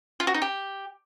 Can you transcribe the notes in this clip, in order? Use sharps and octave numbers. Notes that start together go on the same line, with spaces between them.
F4
F#4
D#4
G4